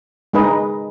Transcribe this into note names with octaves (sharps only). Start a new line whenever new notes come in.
G#3 D#4 G#4 B4 D#5